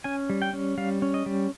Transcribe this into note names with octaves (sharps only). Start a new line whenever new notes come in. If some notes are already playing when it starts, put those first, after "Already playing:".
C#4 G#5
G3
G5
C#4
G3 F5
C#4
D#5
G3